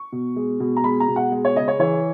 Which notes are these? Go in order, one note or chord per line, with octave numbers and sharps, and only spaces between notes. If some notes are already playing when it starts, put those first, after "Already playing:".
Already playing: C#6
B2
G#3
B2
A#5
G#3 B5
A#5
B2
F#5
G#3
C#5
C#3 D#5
C#5
E3 C#5